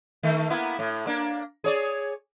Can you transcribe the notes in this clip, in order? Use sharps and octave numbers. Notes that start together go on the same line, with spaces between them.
D#3 A3
A#3 B3 E4
A2
A#3 D4
G#4 C#5 D5